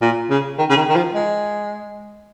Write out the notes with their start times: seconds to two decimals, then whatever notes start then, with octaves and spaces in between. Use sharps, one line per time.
0.02 A#2
0.30 C#3
0.58 D#3
0.70 C#3
0.77 D#3
0.89 D#3
0.96 F3
1.15 G#3